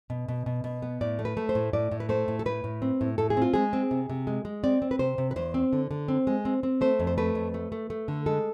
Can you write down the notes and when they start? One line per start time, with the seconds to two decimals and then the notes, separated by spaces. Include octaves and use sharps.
0.10 B2
0.28 B2
0.46 B2
0.64 B2
0.82 B3
1.01 A2 D5
1.19 A3
1.25 B4
1.37 A3
1.49 C5
1.55 A2
1.73 A2 D5
1.91 A2
2.00 B4
2.09 A3 C5
2.28 A2
2.39 A4
2.46 A2 B4
2.64 A2
2.82 C4
3.01 A2
3.18 A2 A4
3.30 G#4
3.37 C4 F4
3.54 G#3 G#4
3.73 C4
3.91 C3
4.10 C3
4.27 G#3
4.45 G#3
4.63 C4 D5
4.82 C4
4.91 B4
4.99 C3 C5
5.18 C3
5.31 B4
5.36 E2 C5
5.54 C4
5.73 D3
5.91 D3
6.08 C4
6.27 G#3
6.45 C4
6.63 C4
6.81 A3 C5
7.00 F2
7.07 C5
7.18 A3 B4
7.35 F2
7.54 A3
7.72 A3
7.90 A3
8.08 D3
8.26 G#3 A4